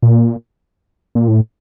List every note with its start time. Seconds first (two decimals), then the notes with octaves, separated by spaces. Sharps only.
0.02 A#2
1.15 A#2
1.28 A2